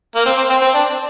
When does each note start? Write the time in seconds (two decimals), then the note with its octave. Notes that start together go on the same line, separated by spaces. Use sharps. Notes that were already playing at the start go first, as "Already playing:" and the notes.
0.16 A#3
0.26 C4
0.37 C4
0.50 C4
0.62 C4
0.74 D4